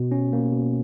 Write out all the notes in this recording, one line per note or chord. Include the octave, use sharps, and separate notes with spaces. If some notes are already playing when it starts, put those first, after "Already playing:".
Already playing: B2
C#4
A#3
B2